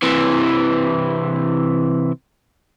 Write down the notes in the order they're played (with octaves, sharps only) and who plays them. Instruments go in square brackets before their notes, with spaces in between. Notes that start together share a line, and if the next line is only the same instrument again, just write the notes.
[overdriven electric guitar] C3 E3